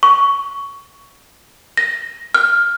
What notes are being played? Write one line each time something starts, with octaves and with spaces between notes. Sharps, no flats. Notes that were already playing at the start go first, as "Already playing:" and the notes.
C#6
A#6
F6